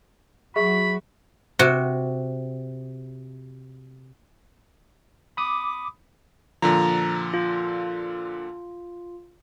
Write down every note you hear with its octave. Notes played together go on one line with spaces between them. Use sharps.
F#3 F#4 G#4 E5 B5 C#6
C3 F#4
B5 D6 D#6
A#2 D3 F3 A#5
F4